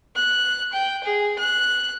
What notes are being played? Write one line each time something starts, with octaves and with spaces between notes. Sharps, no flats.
F#6
G5
G#4
F#6